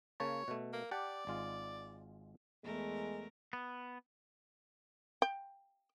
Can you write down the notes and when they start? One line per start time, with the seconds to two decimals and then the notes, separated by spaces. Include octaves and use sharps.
0.20 C#3 A#3 C#5 A5
0.48 B2 A3
0.73 A#3
0.91 G4 D5 F#5 A5
1.27 G#1 G#3 F4
2.64 E2 G#3 A3 A#4
3.53 B3
5.22 G5